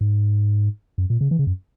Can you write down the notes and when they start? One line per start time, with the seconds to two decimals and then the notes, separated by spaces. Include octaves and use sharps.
0.01 G#2
0.98 F#2
1.10 A#2
1.21 C#3
1.31 E3
1.39 C#3
1.47 F#2